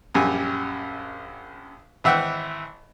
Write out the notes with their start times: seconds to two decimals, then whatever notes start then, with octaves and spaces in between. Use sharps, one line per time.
0.15 A#1 F#2 G3 G#5
2.04 G#1 E3 E5 F#5 G5